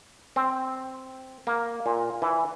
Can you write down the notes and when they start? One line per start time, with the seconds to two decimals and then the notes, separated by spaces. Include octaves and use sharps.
0.36 C4
1.47 A#3
1.86 A#2
2.22 E3